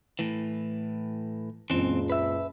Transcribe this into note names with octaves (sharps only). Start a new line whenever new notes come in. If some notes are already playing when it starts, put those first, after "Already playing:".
A2 E3
F#1 C#2 A#2 E3 C4
B4 E5